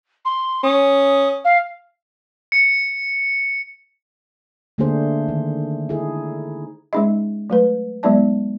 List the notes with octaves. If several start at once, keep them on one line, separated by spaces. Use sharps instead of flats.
C6
C#4 D#6
F5
C#7
D3 A3 A#3 D4 G#4 C5
D#3
D#4 E4 G#4 A4
G#3 C#4 D#4 G#4 D#5
F#3 A3 B4
F#3 G#3 B3 D#4 D5 A5